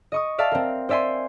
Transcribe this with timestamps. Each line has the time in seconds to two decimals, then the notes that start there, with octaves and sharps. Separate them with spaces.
0.12 D#5 C#6 D#6
0.38 D5 E5 F5 A5
0.52 C4 A#4
0.89 C5 D5 E5 G#5 C6